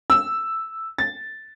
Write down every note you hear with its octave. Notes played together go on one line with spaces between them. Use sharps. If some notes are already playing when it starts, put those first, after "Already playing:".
E6
A6